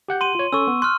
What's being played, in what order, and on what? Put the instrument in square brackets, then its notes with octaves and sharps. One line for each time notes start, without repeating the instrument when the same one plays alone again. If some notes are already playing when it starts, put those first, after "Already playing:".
[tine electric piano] G4 F#5 G6
[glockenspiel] C6 D#7
[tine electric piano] F4 C#5
[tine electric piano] C#4 A4 [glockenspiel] C#6 E6
[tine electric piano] B3
[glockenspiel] C6 F6 [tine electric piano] F#6